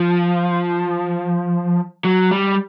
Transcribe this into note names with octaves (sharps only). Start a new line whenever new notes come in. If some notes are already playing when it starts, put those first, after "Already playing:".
Already playing: F3
F#3
G3